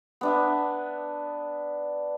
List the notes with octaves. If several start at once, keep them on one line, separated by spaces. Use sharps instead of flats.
B3 D4 E5